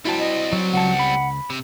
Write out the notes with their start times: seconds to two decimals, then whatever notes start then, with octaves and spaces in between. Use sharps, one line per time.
0.05 G3 C4 E4 F#4 A5
0.19 D#5
0.53 F#3
0.73 C#2 F#5 A5
0.99 B5
1.50 C3